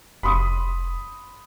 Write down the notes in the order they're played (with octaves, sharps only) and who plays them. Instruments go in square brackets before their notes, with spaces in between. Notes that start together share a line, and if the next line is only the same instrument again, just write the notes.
[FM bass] F1 [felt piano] B5 C6 D#6